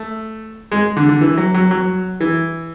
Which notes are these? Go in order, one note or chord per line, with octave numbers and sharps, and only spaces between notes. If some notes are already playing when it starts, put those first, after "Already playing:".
Already playing: A3
G#3
D3
D3
E3
F#3
F#3
F#3
E3